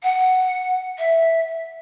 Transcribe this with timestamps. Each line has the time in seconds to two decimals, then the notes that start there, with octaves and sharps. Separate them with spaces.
0.03 F#5
0.99 E5